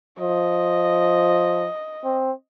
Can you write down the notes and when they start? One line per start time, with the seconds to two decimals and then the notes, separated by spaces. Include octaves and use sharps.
0.20 F3 D#5
2.04 C4